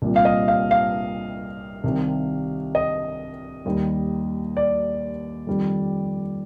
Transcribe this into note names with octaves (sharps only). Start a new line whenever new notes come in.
C2 A#2 G3
F5
D#5
F5
F5
C2 C3 D#3
D#5
D#2 D#3 G3
D5
F2 D#3 G3